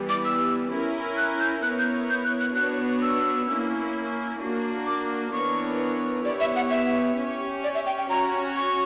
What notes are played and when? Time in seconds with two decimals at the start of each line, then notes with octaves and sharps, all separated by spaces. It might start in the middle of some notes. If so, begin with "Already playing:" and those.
Already playing: E3 G3 B3
0.09 D6
0.25 E6
0.71 C#4 E4 A#4
1.17 F#6
1.40 G6
1.63 B3 E4 A#4 C#5 F#6
1.79 G6
2.10 G6
2.24 F#6
2.41 F#6
2.55 B3 D4 F#4 C#5 F#6
3.02 E6
3.48 A#3 C#4 E4
4.40 A#3 D4 F#4
4.87 D6
5.32 E3 B3 D4 A#4 C#5 C#6
6.25 B3 E4 G4 C#5 D5
6.40 E5
6.56 F#5
6.70 E5
7.17 C#4 G4 C#5
7.64 D5
7.75 E5
7.86 G5
7.98 G5
8.09 C#4 F#4 C#5 A#5
8.56 C#6